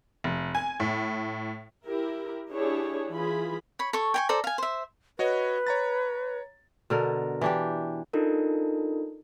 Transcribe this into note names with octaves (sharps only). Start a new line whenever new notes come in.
F1
G#5
A2
E4 G4 A#4
D4 E4 G4 G#4 C#5
E3 F4 G#4 B5
C#5 B5
A4 C#5 C#6
G5 G#5 C#6
A4 C5 D5 A#5
F5 G#5
C5 E5
F#4 B4 C#5 D#5
C#5 A#5 A6
B2 D3 A#4
E3 D4 G4
D4 D#4 F4 A4 A#4